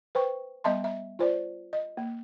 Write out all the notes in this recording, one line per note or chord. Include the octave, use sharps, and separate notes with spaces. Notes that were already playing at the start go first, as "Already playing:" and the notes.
B4 C5 G5 C#6
G3 B3 D#5 E5 A5 C6
E5
F4 C5 D5
D#5
A#3